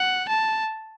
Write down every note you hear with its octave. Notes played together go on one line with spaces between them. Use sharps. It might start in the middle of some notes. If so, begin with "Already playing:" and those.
Already playing: F#5
A5